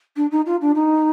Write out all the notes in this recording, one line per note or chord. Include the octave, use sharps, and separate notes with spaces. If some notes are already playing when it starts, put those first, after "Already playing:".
D4
D#4
F4
D4
D#4